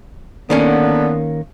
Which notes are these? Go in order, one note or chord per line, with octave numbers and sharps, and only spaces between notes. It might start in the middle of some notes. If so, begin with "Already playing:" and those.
D3 D#3 A#3 B3 C#4